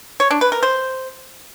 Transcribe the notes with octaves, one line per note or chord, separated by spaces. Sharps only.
C#5
D4
B4
A#4
C5